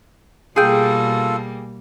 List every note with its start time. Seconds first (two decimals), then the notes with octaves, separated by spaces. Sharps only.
0.56 B2 G3 A#3 F4 G#4 A4 G5